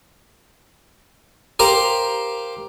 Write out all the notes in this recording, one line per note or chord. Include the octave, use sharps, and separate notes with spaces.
G4 A#4 C5 F5 G5